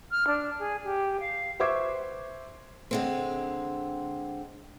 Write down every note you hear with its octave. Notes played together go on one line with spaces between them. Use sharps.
F6
D4
G#4
G4
F5
B4 C5 E5 C#6 D6 G#6
D3 G#3 C4